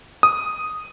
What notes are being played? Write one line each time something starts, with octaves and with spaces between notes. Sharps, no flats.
D#6